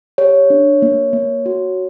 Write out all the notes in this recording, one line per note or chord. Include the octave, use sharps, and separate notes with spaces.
G4 C#5
D4
A#3
A#3
F#4